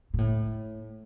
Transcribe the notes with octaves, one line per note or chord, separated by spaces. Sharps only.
A#2
A2